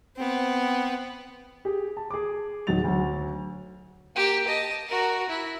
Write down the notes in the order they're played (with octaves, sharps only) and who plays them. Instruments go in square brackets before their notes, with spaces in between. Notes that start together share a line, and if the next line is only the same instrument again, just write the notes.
[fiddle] B3 C4
[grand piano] G4 G#4
A5
G#4 D6
D1 D#3 F#3 A6 F7
D2 F#3
[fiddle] A#3 G4
D#5 A5
F#4 A#4
E4